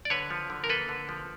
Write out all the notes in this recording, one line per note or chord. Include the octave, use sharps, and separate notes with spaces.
D5
D3 B4 C#5
F3
D3
A#4
A#3 A4 B4
D3
F3